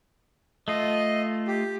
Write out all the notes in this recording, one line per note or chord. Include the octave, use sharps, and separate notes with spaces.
A3 F4 D#5
G4